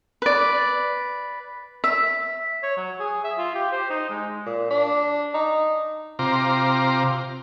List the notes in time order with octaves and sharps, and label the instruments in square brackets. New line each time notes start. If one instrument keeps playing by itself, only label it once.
[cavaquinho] B4 D5
E5
[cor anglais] C#5
F#3
G#4
E5
F4
G4
C5
D#4
G#3
[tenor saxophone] A#2
D4
D#4
[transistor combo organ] C3 F4 A#5 C6 D6